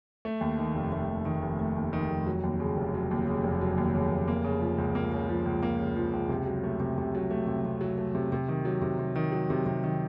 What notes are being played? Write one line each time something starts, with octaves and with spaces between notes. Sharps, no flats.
A3
D#2
D#3
F1
A3
D#2
D#3
F1
A3
D#2
D#3
F1
F#3
D#2
C#3
F1
F#3
D#2
C#3
F1
F#3
D#2
C#3
F1
A#3
C#3
F3
C#2
A#3
C#3
F3
C#2
A#3
C#3
F3
C#2
C3
F#3
A3
C3
C3
F#3
A3
C3
C3
F#3
A3
C3
C3
D#3
F#3
C3
C3
D#3
F#3
C3
C3
D#3